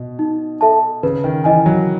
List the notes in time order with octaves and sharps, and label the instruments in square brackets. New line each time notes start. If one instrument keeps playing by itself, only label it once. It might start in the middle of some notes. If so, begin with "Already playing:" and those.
Already playing: [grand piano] B2
[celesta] D#4
A4 E5 A5
[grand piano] C#3 [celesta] B4
[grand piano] D#3
[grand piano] E3 [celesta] D#5 G#5
[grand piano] F#3